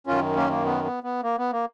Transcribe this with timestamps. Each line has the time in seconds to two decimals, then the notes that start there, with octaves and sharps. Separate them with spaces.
0.07 F#2 D#3 C#4 F4
0.36 A#3 C#4
0.50 A#3
0.65 B3
0.84 B3
1.04 B3
1.23 A#3
1.38 B3
1.52 A#3